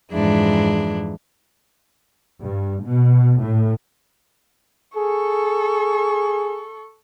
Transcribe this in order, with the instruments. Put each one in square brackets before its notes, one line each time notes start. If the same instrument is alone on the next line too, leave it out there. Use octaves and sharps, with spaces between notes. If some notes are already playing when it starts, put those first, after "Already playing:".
[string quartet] F2 G#2 E3 G#3 D4 E4
[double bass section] G2
B2
A2
[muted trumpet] G#4 [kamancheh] A4 C#6